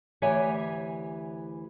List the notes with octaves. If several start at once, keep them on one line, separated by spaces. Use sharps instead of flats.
D2 E3 G4 C#5 E5 G#5